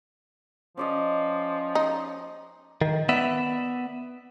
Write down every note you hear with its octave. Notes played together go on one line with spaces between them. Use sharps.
F3 C#4 D5 D#5
D#4
D#3
B3 D5 E5